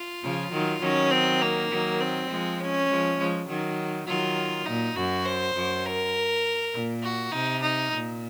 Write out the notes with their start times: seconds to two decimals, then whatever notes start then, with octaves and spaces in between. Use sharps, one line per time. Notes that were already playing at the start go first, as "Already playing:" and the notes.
Already playing: F4
0.23 C#3 F3
0.52 D#3 F#3
0.82 D#3 F#3 C#4
1.11 C4
1.42 A#3
1.71 D#3 F#3
2.01 C4
2.29 F3 G#3
2.60 C#4
2.89 F3 G#3
3.18 F3 G#3
3.48 D#3 F#3
4.07 D#3 F#3 F4
4.66 A#2 D#4
4.96 F#2 F#4
5.25 C5
5.55 F#2
5.85 A#4
6.73 A#2
7.03 F#4
7.32 C3 D#4
7.62 D#4
7.92 A#2